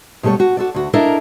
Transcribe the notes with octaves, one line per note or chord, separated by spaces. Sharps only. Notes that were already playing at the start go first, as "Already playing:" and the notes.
B2 G3 A3 A4 C#5
F#4
F#4 A4 D5
D2 F#4
D4 E4 A4 A#4 D#5 F5